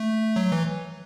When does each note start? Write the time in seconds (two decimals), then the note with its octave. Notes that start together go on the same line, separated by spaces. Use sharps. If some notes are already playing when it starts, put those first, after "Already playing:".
Already playing: A3
0.36 F#3
0.52 E3